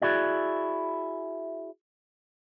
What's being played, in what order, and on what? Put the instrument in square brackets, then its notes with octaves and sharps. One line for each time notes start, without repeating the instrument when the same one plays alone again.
[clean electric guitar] E4 F#4 G#4 D5